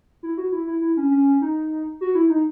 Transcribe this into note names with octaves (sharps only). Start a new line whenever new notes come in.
E4
F#4
E4
E4
E4
C#4
C#4
D#4
F#4
E4
D#4